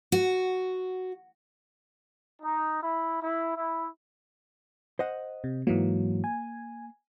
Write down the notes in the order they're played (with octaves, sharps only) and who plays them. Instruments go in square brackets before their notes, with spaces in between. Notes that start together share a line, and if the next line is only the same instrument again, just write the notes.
[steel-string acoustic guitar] F#4
[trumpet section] D#4
E4
E4
E4
[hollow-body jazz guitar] C5 D#5 F#5
[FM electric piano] C3
[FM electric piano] G#2 E3 F#3 [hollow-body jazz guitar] A#3
[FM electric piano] G#5